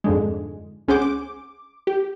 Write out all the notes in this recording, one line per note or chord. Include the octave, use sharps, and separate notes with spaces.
F2 G#2 D3 G#3
C#2 C#4 G#4 C5 F#5 D6
D6
G4